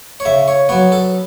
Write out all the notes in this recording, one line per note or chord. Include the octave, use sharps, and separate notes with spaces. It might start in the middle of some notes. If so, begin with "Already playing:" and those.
C#5
C#3 E5
C#5
F#3 B3 C#5
A4